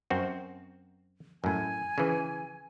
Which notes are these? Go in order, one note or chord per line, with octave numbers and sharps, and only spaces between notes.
F#2 C4 F#4
F#2 A2 G#5
C#3 E3